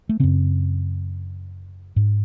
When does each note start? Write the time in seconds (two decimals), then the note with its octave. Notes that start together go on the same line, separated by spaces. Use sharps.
0.09 A3
0.20 F#2 C#3 C4
1.96 G#2